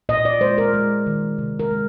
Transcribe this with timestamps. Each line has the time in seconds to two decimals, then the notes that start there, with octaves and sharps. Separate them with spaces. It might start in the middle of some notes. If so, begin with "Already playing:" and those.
0.09 A#2 D#5
0.25 D5
0.40 G#3 C5
0.58 A#4
0.74 G#3
1.06 D#3
1.38 C3
1.59 A#4
1.71 G#3